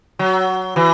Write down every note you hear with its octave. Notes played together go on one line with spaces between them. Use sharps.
F#3
E3